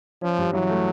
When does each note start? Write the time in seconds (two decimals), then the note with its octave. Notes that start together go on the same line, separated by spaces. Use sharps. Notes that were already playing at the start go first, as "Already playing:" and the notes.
0.22 F3 C#4
0.38 G2
0.53 E3 F#3
0.69 A3